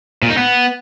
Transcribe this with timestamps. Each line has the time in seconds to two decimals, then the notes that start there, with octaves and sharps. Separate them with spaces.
0.22 A#2
0.30 D#4
0.37 B3